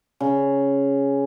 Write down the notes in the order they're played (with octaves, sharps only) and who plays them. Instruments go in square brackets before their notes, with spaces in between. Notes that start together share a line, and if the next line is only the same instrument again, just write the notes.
[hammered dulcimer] C#3